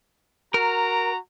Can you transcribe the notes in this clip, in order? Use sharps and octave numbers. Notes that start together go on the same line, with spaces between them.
F#4 A#4 A#5